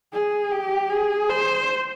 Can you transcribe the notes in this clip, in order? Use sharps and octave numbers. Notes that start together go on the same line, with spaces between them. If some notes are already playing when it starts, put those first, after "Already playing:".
G#4
G4
G#4
C5